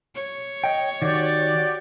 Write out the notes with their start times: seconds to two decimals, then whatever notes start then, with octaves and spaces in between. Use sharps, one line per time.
0.15 C#5
0.64 D#5 G5
1.02 D#3 F#4 G4 D5